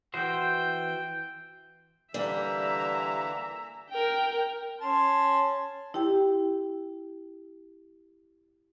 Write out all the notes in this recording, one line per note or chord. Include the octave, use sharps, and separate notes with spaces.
E3 F#4 C5 G5
D3 E3 G3 A#3 E5 A#5
A#4 G5
C#4 A5 C6
E4 G4 G5